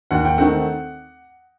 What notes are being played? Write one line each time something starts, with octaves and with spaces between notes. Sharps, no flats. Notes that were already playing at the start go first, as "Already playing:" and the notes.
D#2 F#5
G5
D#3 A3 C4 F#5